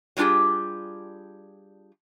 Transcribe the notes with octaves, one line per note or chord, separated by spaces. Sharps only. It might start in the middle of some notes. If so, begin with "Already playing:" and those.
F#3 G3 D4 F4 G4 G#4